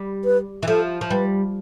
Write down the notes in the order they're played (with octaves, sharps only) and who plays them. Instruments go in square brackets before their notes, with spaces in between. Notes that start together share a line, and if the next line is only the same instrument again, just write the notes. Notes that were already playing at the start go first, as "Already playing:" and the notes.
Already playing: [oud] G3
[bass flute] B4
[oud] E3
[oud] F3 [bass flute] A4
[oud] F3
[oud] G3 [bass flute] B4